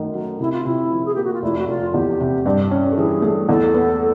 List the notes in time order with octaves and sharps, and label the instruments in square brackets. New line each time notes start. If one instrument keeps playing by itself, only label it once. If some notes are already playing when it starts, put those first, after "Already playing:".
Already playing: [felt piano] F#2 D#3 A3
F#3
[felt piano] C3 [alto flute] E4
[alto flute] F4
[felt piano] C3 [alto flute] E4
[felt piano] F3
[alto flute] G#4
[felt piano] A#3 [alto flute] G4
[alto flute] F#4
F4
[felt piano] F1 [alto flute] E4
[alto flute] F#4
[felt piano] F1 [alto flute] F4
[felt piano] E2 [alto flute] G4
[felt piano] C3
G2
C#4
[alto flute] A4
[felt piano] E3 [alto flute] G#4
[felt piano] A3
[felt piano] E2 [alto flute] A4
[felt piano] B3